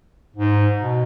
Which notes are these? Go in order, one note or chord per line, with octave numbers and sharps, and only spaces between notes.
G#2
B2